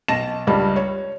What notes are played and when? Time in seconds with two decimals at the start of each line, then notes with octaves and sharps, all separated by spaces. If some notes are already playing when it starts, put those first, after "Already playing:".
0.08 B1 A5 A#6 E7
0.47 C#2 G2 G3
0.76 C#5